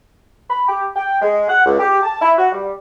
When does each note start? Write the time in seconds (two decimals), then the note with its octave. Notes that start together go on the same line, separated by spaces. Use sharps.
0.50 B5
0.68 G4
0.96 G5
1.21 G#3
1.48 F#5
1.66 C#2
1.80 G4
2.03 A5
2.22 E4
2.37 F#4
2.52 G3